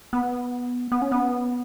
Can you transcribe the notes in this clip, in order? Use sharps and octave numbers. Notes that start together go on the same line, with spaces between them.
B3
B3
C#4
B3